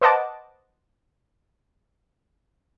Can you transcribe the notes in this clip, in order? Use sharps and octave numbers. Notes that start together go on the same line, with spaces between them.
B4 C5 D#5 F#5 A5 D6